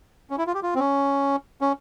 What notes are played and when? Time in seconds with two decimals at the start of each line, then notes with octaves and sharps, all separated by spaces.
0.30 C#4
0.38 E4
0.47 F4
0.54 G4
0.63 F4
0.75 C4
0.79 C#4
1.61 C#4